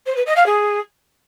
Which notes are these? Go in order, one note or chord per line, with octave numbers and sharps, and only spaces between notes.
C5
B4
D#5
F5
G#4